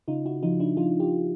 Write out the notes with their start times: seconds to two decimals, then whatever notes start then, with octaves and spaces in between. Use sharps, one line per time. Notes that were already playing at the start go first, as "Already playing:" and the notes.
0.08 C#3 D#4 F4
0.26 E4 F#4
0.43 F3 D#4 F4
0.59 D4 E4
0.77 F3 D#4 F4
1.00 F4 G4